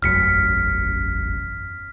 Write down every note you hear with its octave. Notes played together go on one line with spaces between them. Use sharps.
E1 A1 F#2 F6 B6 C#7